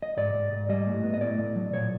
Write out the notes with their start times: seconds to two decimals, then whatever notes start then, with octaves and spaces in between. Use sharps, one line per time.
0.02 D#5
0.17 G#2 D5
0.34 G#2
0.52 G#2
0.69 G3 D#5
0.87 A2
1.03 B3
1.14 D#5
1.21 A2 D5
1.38 A2
1.56 F#3
1.73 A#2 C#5